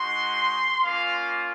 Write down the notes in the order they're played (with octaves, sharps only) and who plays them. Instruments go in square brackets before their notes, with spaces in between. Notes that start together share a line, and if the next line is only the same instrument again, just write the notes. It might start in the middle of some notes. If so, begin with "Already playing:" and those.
Already playing: [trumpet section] G#3 D#4 F#4 C6
A#3 C#4 F4 F5